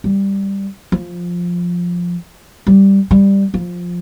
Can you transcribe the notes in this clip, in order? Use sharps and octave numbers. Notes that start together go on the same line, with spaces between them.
G3
F3
G3
G3
F3